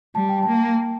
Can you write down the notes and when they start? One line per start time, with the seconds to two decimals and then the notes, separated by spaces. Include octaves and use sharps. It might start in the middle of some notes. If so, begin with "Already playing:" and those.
0.15 G3 A5
0.29 G5
0.43 A5
0.48 A#3